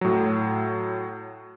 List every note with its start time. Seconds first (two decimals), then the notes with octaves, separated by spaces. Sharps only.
0.01 A2 F#3